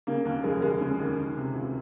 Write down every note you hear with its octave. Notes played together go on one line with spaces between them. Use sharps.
C#3 A#3
D#2 A#3
F1 G#3
D#2 G#3
C#3
D#2
D#3
C3
C#2